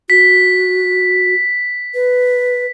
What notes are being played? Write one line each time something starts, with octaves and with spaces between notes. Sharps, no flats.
F#4 B6
B4